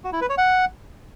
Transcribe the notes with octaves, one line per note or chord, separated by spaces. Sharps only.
F#4
E4
B4
C#5
F#5